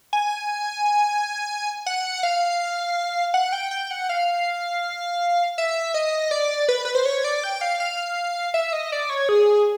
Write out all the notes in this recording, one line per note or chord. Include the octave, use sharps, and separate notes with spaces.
G#5
F#5
F5
F#5
G5
G5
F#5
F5
E5
D#5
D5
B4
B4
C5
C#5
D5
G5
F5
F5
E5
D#5
D5
C#5
G#4